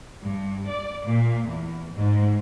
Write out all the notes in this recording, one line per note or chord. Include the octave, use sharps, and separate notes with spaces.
G2
D5
A#2
E2
G#2